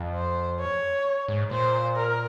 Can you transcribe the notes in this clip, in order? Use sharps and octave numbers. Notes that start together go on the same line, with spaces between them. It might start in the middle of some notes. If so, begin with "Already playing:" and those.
Already playing: F2
C5
C#5
G#2
A#2 C5
A#4